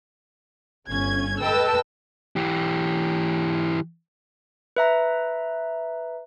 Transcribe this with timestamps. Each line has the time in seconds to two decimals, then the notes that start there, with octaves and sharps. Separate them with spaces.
0.89 G1 C#4 G#6
1.41 A4 B4 D#5 G5 A5 E6
2.36 E3 G4
4.77 B4 E5 A#5